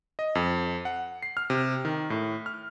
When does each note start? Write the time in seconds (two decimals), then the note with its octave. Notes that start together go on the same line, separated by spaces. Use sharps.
0.19 D#5
0.35 F2
0.85 F#5
1.23 C7
1.37 F6
1.50 C3
1.85 D#3
2.10 A2
2.46 F6